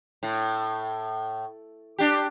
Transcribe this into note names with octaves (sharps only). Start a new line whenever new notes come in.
A2
D4 G4